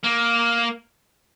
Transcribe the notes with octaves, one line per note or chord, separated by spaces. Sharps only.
A#3